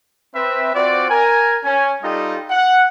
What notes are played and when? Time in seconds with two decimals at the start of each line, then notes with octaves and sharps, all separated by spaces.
0.35 C4 B4 E5
0.74 C4 F4 F#4 C5 D5
1.10 A#4 G#5
1.64 C#4 G#5
2.03 G3 D#4 F4 G4 A4 D#5
2.50 F#5